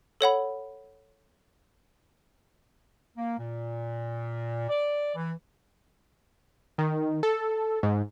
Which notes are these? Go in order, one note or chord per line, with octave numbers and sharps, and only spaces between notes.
A4 C#5 F#5 B5
A#3
A#2
D5
E3
D#3
A4
G#2